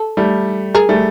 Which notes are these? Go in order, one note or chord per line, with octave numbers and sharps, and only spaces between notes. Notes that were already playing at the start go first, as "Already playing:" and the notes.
Already playing: A4
G3 A3
G#4 A#4
G3 A3